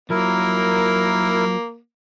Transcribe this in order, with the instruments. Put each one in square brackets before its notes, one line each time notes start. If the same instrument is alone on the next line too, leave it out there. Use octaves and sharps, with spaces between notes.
[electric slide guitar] F3 F#3 [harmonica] A#3 [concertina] E4 A#4